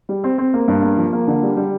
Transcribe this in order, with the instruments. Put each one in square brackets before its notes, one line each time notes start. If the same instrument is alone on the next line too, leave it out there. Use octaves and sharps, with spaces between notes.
[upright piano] G3
C4
C4
A#3
G2
A#3
F3
A#3
D3
G3
G3